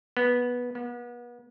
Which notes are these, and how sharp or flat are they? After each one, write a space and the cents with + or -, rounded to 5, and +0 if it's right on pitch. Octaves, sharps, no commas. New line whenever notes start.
B3 -10
B3 -35